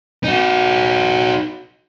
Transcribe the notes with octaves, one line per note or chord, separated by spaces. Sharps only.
D#4 F#4